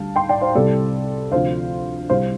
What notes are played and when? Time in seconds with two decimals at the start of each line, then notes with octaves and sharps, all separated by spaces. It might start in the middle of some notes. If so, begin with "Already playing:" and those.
Already playing: D2 D3 G3 F5 A5
0.16 G5 C6
0.29 D5 G5
0.41 C5 F5
0.55 C2 C3 G3 A4 D5
1.32 D2 C3 F3 C5 F5
2.10 C2 C3 G3 C5 F5